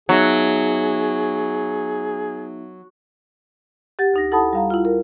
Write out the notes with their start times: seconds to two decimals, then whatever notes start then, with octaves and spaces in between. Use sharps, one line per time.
0.09 F#3 B3 D#4 G#4 E5
3.99 G4 F#5 A6
4.14 D2 D#4 A#6
4.32 E4 A4 F#5 A5 B5 D#6
4.53 G3 F5 A#5
4.70 E4 F4
4.85 A#4